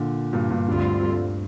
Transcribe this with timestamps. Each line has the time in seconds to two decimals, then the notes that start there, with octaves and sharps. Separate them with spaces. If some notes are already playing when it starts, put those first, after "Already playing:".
Already playing: A#2 D3
0.33 G2 A#2
0.51 G2 A#2
0.68 D2 G2 D3 G3 C4 F4